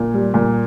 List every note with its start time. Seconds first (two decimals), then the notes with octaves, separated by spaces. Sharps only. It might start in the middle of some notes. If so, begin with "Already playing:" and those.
Already playing: A#2
0.14 G3
0.34 A#2